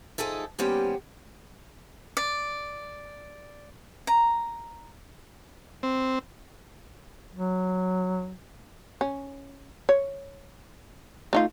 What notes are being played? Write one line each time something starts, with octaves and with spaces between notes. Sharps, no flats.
F3 D#4 G#4 A4 E5
D#2 G3 B3 C#4 G4 C5
D5
A#5
C4
F#3
C#4
C#5
A3 D#4 F4